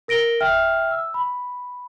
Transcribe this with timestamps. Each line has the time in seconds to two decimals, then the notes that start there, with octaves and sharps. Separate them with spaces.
0.08 A#4 A#6 D7 G7
0.40 E5 G5 F6
0.91 E6
1.14 B5